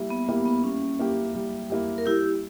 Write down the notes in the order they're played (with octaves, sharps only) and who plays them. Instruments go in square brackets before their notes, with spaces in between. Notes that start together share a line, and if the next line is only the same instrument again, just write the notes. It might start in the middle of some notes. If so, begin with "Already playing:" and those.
Already playing: [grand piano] G3 A#3 E4
[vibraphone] B3
[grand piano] A#3 E4 G4 [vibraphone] B3
[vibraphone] B3
[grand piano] G3 [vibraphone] C#4
[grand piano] A#3 E4 G4
G3
A#3 E4 G4
[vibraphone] A#4
[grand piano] G3 [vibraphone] E4 G4